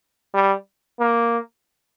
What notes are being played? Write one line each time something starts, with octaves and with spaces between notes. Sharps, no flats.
G3
A#3